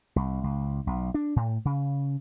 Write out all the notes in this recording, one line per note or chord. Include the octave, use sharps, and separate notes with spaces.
C2
C#2
B1
D4
A2
C#3